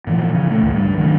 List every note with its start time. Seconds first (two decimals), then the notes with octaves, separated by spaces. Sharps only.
0.07 A#2 E3 F3
0.35 C#3
0.46 A#2 A3
0.62 G#1 C#2 A2
0.75 G2 G3
0.98 D#3 F#3 G3 D4